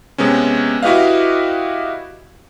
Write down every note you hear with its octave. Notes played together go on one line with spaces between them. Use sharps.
C3 G#3 B3 C#4
E4 F#4 G4 B4 D#5 F5